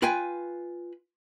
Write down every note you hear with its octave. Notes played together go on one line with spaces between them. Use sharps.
F4 B4 G5 G#5